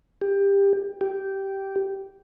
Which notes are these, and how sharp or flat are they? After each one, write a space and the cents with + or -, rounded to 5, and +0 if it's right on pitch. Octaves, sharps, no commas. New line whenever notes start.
G4 +20
G4 -10